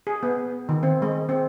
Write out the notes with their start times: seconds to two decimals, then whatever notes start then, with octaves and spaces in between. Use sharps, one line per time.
0.07 G#4
0.23 B3
0.69 D#3
0.83 C4
1.02 G#3
1.29 C4